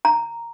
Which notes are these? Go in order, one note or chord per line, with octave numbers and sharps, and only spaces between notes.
A#5